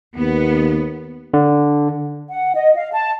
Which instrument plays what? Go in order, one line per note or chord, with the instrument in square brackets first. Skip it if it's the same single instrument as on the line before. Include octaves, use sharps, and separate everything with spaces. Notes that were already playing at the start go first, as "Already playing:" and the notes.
[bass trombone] D#2 [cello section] B3
[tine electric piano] D3
[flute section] F#5
D#5
F5
A5